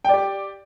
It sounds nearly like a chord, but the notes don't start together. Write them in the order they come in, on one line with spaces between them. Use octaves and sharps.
G5 D5 G4